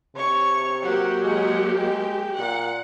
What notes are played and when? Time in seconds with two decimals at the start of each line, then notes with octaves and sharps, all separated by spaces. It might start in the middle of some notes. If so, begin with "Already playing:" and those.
0.15 C3 C#5 C#6
0.84 F#3 A#3 G4 F#5
1.24 G#3 G#4 F#5
1.78 G#3 G5
2.38 A#2 F#5